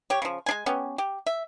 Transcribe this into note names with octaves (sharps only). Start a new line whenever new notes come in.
G4 C#5
C#3 F3
G#3 D4 G#5
B3 C#4 G4
G4
E5